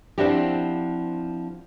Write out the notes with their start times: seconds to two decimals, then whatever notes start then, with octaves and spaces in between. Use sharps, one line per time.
0.18 F3 C4 D4 E4 F#4 G4